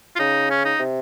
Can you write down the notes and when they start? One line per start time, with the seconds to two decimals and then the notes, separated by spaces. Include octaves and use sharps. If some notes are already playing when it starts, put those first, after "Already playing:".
0.16 F4
0.19 C#3 D#4
0.50 C#4
0.65 D#4
0.80 C3